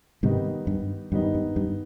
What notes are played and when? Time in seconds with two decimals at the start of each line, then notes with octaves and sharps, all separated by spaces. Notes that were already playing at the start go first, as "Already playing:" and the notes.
0.23 G#2 C3 D#3 G3 B3 D#4
0.67 G2
1.12 G2 D#3 G3 B3 D#4
1.35 G2
1.56 G2